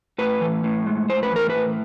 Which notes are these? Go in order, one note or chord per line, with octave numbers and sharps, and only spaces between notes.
A2 B4
E3
A2
G#3
A2 C5
B4
E3 A#4
B4
A2